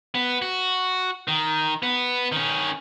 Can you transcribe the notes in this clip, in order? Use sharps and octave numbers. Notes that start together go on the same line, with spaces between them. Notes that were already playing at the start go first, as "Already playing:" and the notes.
B3
F#4
D#3
B3
D#3 C#4